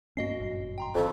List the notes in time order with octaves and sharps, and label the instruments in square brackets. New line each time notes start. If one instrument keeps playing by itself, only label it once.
[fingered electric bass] G2 A#3 C#4 [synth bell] F#4 D#5 C7
[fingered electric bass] G1 F#2 A#2
[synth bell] G5 A#5 C6
[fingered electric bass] F#1 D#3 [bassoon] F2 [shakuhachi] A4